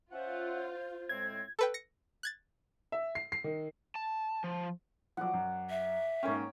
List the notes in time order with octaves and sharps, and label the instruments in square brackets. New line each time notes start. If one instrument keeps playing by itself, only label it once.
[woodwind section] C#4 E5 F#5 [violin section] F4 [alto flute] C5
[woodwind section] A2 G#3 C4 [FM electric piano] G#6
[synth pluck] A4 B4 G5
A#6 C#7
F#6 G#6 A6
[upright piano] E5
C7
C7
D#3
[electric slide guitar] A5
F3
[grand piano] F3 F#3 [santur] D5 F#5
[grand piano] F#2
[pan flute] E5
[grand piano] G#2 A#3 C#4 [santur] C#5 G5